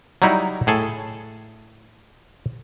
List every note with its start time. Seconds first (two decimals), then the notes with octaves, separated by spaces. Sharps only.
0.22 F#3 G3 D#4 E4
0.67 A2 G#4 A4